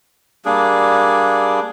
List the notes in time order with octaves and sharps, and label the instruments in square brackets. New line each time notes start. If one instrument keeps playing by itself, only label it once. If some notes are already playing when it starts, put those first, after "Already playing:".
[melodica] G3 A#3 D4 G#4